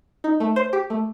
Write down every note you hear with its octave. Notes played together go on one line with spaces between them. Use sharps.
D#4
A3
C5
G4
A3